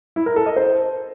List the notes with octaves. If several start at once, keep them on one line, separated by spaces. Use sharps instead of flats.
E4
A#4
A4
D#5
C5